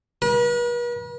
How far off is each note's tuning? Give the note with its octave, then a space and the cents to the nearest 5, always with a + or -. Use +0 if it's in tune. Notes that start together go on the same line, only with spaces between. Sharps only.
B4 -45